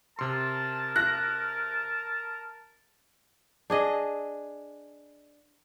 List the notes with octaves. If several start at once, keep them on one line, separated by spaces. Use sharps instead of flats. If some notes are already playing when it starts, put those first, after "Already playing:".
C3 A#4 A5 C6
A5 F#6 A#6
D4 G#4 D#5